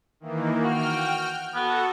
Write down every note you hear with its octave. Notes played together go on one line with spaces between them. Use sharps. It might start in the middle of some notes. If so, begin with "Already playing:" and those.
D#3 E3 A#3
F#4 G5 F6
B3 F#4 A4